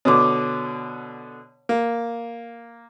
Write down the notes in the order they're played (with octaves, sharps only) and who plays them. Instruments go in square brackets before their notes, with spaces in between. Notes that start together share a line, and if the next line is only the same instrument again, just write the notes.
[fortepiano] B2 D3 [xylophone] C#5 D6
[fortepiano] A#3